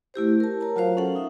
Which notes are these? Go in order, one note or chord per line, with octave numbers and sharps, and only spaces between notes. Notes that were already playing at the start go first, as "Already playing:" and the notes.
A3 E4 G4 C5
A#4 A5
A#4 C#5 A5 A#5
F#3 F4 F#4 C5 F5
C#4 A4 F#5
D#4 E5